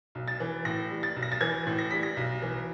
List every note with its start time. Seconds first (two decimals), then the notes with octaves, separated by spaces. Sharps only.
0.15 B1
0.28 A6
0.40 E3
0.65 A2 A#6
0.90 G3
1.03 A6
1.16 B1
1.23 A#6
1.32 A6
1.41 E3 G#6
1.66 A2
1.79 A#6
1.91 G3 B6
2.03 A#6
2.17 B1
2.42 E3